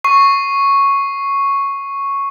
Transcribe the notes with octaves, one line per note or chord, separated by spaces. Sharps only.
C#6 C7